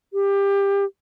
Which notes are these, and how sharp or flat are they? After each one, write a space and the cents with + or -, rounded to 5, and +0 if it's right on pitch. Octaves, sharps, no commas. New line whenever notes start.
G4 +20